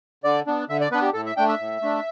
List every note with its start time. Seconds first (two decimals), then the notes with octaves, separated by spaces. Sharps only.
0.24 D3 D5
0.47 B3 D4
0.69 D3 E5
0.81 D5
0.91 B3 D4 B4
1.02 G4
1.13 A2 A4
1.26 E5
1.37 A3 D4 G5
1.49 E5
1.60 A2
1.82 A3 D4